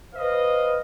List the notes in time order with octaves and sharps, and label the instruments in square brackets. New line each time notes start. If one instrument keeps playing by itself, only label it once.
[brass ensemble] B4 C5 D#5 F5